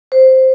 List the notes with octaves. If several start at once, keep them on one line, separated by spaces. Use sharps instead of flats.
C5